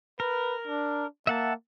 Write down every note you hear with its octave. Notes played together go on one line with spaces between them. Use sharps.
A#4 B4
D4
A#3 E5 F#5 A5